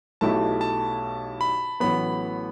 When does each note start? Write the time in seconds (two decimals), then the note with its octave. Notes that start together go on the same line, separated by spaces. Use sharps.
0.21 B1 B2 A3 E4 G4 A5
0.61 A5
1.41 B5
1.80 A1 A2 F#3 B3 B5